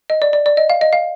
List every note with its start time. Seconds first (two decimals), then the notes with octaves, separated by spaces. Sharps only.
0.10 D#5
0.22 D5
0.33 D5
0.46 D5
0.57 D#5
0.70 F5
0.81 D#5
0.93 F5